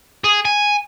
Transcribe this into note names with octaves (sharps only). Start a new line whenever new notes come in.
G#4
G#5